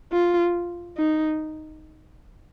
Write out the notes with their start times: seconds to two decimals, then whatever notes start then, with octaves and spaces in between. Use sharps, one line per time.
0.12 F4
0.97 D#4